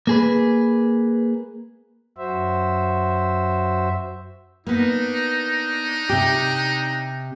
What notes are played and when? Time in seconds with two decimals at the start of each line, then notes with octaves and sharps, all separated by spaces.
0.07 A#3 G#4 B4
2.18 F#2 F#4 C5 E5
4.67 A#3 B3 D4 D#4
6.09 C3 G4